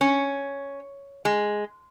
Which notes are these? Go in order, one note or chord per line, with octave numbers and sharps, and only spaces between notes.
C#4
G#3